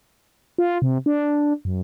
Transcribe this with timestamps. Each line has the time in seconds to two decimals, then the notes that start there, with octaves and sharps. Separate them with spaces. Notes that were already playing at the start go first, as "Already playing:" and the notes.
0.58 F4
0.82 C3
1.06 D4
1.65 F#2